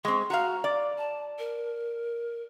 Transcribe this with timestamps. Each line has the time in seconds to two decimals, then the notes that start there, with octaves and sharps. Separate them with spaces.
0.05 G#3 C4 C#6
0.30 F#4 F5 A#5
0.64 D5
0.98 A5
1.39 A#4